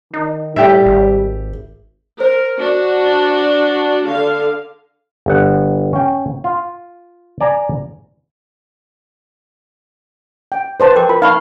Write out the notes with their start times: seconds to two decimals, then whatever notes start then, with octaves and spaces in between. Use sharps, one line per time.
0.13 D#3 D#4
0.56 A2 G3 G4 E5
0.86 G#1
2.20 A#4 C5
2.58 D4 F#4
4.07 D3 F5
5.26 G1 F#5
5.93 C#4 G5
6.44 F4
7.41 D5 G#5 A#5
10.52 G5
10.80 B4 C5 A5
10.96 A#4 G5 D6
11.09 F4 B5
11.22 D#4 F5 B5 C#6